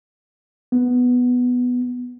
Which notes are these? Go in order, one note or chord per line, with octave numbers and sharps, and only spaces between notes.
B3